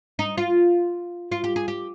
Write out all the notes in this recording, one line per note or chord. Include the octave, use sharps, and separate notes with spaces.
D#4
F4
F4
G4
G#4
G4